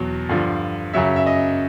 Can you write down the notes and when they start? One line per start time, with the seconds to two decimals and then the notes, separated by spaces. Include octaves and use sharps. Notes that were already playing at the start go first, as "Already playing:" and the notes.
Already playing: E2 B2 F#3
0.29 G2 D3 F3
0.94 F#2 C#3 F#3 E5
1.16 E5
1.26 D#5